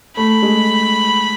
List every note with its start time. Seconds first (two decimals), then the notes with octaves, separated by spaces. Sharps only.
0.16 A3 B5
0.43 G#3